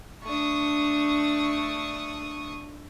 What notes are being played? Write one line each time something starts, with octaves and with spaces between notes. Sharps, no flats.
A3 D4 C#6 D#6